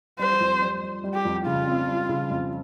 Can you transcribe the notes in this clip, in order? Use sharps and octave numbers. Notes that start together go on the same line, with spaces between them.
G3 C5
F2
G3
G3
G3
G4
F2
C#3 F4
C4
G3
C#3
F2